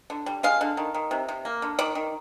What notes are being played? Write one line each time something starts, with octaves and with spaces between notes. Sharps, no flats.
D3
G3
G#3 F5
D3
D#3
D#3
C3
C3
A#3
D3
D#3 D5
D#3